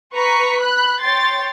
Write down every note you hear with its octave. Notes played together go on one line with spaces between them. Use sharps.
B4 A#5 C#6 B6
B5 F#6
C#5 G5 C6 A6